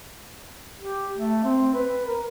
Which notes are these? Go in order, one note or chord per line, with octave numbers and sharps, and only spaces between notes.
G4
A3
C4
B4
A#4